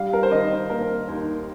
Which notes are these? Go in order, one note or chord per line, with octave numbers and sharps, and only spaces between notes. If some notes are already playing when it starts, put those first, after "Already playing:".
Already playing: G3 F5
A#4
C5
D#3 D#5
A#3 A#4
D#2